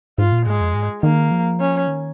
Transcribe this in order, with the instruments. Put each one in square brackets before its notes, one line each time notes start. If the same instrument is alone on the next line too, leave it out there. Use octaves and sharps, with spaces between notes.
[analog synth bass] G#2 [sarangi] F4
[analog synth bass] A#2
[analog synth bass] G#2 [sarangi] G#3
[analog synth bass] F2
G#2
[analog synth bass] D#3 [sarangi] A#3
[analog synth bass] F3
[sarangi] C#4
[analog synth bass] D#3